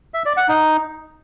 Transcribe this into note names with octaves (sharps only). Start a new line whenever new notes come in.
E5
D5
F#5
D#4